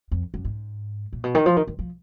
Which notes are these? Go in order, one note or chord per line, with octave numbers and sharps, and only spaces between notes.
F2
F#2
G#2
A#2
B2
D#3
F3
D#3
D#3
F3